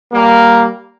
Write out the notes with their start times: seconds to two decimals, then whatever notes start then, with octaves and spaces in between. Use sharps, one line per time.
0.11 G3 A#3